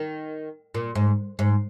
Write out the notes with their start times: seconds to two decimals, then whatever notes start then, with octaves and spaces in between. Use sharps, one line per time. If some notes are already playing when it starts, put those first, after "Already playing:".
Already playing: D#3
0.74 A#2
0.95 G#2
1.39 G#2